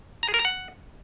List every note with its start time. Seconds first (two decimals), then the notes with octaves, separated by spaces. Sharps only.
0.23 A#5
0.28 G#4
0.34 A#4
0.39 A#5
0.45 F#5